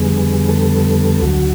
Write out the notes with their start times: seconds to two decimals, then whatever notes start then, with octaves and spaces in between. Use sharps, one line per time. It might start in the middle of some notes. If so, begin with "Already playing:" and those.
Already playing: F2 D3 G3 B3 G#4
0.49 A4
1.22 D2 D3 F#3 F#4